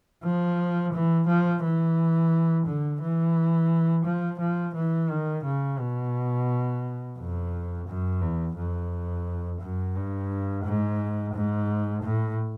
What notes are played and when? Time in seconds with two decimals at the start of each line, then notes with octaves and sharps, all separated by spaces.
0.24 F3
0.93 E3
1.28 F3
1.63 E3
2.67 D3
3.01 E3
4.05 F3
4.40 F3
4.75 E3
5.10 D#3
5.44 C#3
5.79 B2
7.18 F2
7.87 F#2
8.21 E2
8.56 F2
9.61 F#2
9.96 G2
10.65 G#2
11.34 G#2
12.03 A2